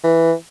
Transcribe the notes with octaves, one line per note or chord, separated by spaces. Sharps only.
E3